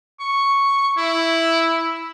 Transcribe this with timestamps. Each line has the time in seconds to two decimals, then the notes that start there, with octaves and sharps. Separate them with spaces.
0.20 C#6
0.97 E4